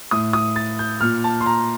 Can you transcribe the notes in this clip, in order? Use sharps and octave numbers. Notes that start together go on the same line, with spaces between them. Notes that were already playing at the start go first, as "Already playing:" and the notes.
A2 D#6
D#6
A6
G6
A#2 F6
A5
C6
A#5